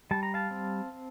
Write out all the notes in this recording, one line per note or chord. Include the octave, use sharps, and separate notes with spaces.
G3 A5
A#5
F5 A5
C4